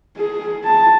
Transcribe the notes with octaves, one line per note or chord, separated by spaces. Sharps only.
G#4
A5